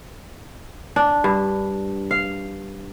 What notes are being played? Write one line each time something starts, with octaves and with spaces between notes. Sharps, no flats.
D4
G2
F5